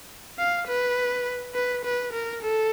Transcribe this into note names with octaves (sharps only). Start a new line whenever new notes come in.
F5
B4
B4
B4
A#4
A4